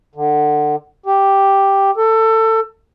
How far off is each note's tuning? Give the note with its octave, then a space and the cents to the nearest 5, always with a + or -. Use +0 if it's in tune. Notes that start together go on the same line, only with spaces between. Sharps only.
D3 +25
G4 +0
A4 +20